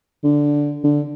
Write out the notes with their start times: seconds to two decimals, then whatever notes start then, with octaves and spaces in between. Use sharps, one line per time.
0.24 D3
0.84 D3